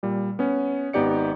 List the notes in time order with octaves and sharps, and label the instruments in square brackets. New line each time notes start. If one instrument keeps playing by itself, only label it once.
[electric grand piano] A#2 G3
B3 C#4
G#1 B3 D#4 G4 D5 C#7